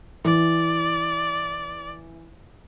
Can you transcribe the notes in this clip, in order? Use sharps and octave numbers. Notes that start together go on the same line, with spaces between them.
E3 D5